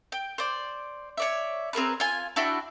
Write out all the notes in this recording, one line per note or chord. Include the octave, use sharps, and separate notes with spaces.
G5
C5 D5
C#5 D5 E5
C4 G#4 A#4 B4
F4 G#5
D4 E4 F#4 G5